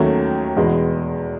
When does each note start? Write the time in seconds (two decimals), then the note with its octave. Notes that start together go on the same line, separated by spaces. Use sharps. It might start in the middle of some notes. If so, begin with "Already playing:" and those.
Already playing: D#2 D#3 F#3 A3 C#4
0.57 E2 B2 G#3 B3